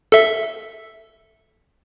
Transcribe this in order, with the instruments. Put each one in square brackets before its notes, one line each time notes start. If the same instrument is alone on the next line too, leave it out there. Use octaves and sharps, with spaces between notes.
[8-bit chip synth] A4 E5